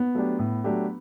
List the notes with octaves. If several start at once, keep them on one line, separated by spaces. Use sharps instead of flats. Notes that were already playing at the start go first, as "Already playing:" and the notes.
Already playing: B3
F#3 A3 D4 G4
A2
F#3 A3 D4 G4